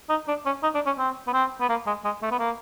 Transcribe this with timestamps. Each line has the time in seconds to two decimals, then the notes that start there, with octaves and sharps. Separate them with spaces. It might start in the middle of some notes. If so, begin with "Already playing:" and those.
0.10 D#4
0.28 D4
0.46 C#4
0.63 D#4
0.75 D4
0.86 C#4
0.98 C4
1.27 B3
1.33 C4
1.61 B3
1.70 A#3
1.87 G#3
2.05 G#3
2.22 A3
2.31 B3
2.39 A#3